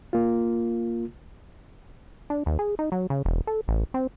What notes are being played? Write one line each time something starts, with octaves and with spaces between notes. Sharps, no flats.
A#3 F4
D4
D#2
G#4
D#4
F#3
C#3
E1
A4
A1
C4